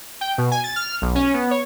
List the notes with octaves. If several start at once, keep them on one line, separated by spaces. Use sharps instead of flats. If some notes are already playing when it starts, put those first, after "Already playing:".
G5
B2
G#5
A6
F6
B1
C#4
B3
C#5